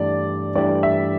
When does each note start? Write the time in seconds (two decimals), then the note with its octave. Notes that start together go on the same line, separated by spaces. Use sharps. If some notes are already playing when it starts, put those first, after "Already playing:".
Already playing: G2 E3 A3 D4 G4 D5
0.56 G2 E3 A3 D4 G4 D5
0.83 E5